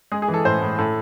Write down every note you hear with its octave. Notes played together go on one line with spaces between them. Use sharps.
G#3 G#4
G#4
E3
A4
A2 C5
A2
A2 A4